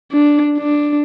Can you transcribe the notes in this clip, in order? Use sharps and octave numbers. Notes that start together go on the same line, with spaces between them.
D4
D4